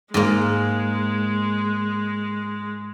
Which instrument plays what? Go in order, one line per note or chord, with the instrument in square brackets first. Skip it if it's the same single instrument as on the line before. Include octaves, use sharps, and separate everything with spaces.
[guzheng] G#2 A#3 [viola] G#3